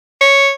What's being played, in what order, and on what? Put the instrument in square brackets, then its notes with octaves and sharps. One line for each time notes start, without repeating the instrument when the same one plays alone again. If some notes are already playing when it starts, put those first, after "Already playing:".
[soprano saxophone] C#5